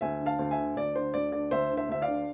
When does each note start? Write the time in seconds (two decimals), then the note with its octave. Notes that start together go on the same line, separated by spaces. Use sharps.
0.01 D2 E5 G#5
0.20 D3
0.26 F5 A5
0.39 D2
0.51 E5 G#5
0.57 D3
0.76 D2 D5
0.95 D3 C5
1.14 D2 D5
1.32 D3 D5
1.51 D2 C5 E5
1.71 D3
1.77 C5 E5
1.89 D2 E5
2.02 D5 F5
2.08 D3